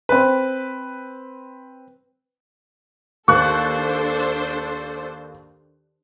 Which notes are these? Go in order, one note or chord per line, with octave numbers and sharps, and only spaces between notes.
C4 B4
D#2 D4 A4 C5 C#6 F#6